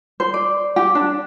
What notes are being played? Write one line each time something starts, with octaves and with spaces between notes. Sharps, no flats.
C5
D5
G4
D4